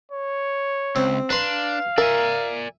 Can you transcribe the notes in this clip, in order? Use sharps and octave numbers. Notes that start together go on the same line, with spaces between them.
C#5
C#2 C4
D4 B4 F5 A#5 C6
A#4 D5 E5 G#5